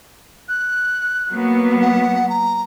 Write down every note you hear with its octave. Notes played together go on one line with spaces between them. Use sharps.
F#6
F#3 A#3 B3
F#5
A#5